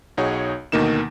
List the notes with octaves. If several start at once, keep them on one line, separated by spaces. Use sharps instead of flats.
B1 D#4 F#4 G#4 C#5
D2 B2 D#3 A#3 D#4 E7